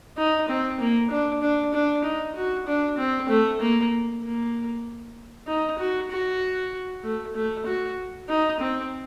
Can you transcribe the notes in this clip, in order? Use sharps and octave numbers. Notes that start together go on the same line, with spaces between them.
D#4
C4
A#3
D4
D4
D4
D#4
F#4
D4
C4
A3
A#3
A#3
D#4
F#4
F#4
A3
A3
F#4
D#4
C4